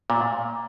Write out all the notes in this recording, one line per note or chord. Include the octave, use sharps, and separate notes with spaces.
A#2